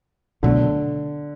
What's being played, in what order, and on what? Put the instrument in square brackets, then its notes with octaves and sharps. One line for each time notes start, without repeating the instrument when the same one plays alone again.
[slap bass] C#2 B2 F#3 A3 [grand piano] D3